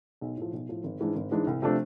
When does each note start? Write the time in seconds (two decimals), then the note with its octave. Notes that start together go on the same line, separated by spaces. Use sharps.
0.21 B1
0.37 A2 F3
0.53 B1
0.69 A2 F3
0.84 G#1
1.00 G#2 E3 G#3 D4
1.16 G#1
1.31 G#2 E3 G#3 D4
1.47 C2
1.62 C3 F3 A3 D4